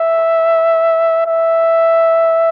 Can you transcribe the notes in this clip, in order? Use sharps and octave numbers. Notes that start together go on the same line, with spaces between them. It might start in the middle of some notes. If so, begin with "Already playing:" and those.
Already playing: E5
E5